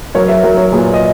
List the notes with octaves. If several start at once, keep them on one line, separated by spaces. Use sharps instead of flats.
F#3 A#4 C#5
C#5 E5
F#3 A#4 C#5
A#4 C#5
A#2 G#4 B4
D#5